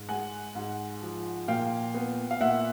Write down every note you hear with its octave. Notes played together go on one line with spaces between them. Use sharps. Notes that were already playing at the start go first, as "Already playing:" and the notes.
Already playing: G#2
G#3 F#5 G#5
G#2
F3
A#2 F5 G5
B3
F5
A#2 E5 F#5